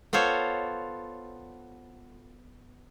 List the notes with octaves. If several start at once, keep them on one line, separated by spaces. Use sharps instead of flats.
B3 F4 A4 C5 C#5